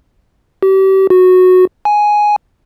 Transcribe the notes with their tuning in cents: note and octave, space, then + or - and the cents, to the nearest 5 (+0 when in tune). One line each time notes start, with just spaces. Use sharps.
G4 -35
F#4 -10
G#5 +5